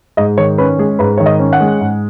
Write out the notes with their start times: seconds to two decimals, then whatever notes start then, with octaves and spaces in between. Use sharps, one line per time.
0.17 G#2 D#5
0.38 D#3 C#5
0.58 C#4 B4
0.78 G#3 G#4
0.99 G#2 B4
1.17 D#3 C#5
1.26 D#5
1.39 C#4
1.53 F#5
1.60 G#3
1.81 G#2